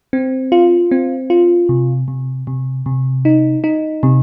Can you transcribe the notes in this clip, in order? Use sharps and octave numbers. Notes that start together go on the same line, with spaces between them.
C4
F4
C4
F4
C3
C3
C3
C3
D#4
D#4
C3